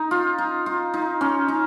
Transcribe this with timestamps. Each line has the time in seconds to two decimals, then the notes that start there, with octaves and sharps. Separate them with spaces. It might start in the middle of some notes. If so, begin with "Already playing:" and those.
Already playing: D#4
0.11 F4
0.38 D#4
0.66 F4
0.94 D#4
1.21 C#4
1.48 D#4